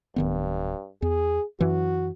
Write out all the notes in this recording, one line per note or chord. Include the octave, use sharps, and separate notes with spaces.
D1 G2 D#3 B3
E2 G#4
F#2 E3 F#3 F#4